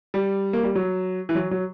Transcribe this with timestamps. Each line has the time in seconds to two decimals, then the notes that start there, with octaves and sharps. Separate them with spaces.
0.14 G3
0.53 A#3
0.63 G3
0.75 F#3
1.29 E3
1.35 F#3
1.51 F#3